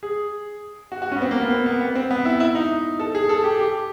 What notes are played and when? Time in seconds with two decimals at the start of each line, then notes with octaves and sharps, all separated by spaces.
0.03 G#4
0.92 F#4
1.02 F#4
1.12 C#4
1.16 B3
1.22 C4
1.31 A#3
1.41 B3
1.51 C4
1.66 B3
1.81 B3
1.95 C4
2.11 B3
2.25 E4
2.40 E4
2.55 D#4
3.00 A4
3.15 G#4
3.29 A4
3.44 G4
3.59 G4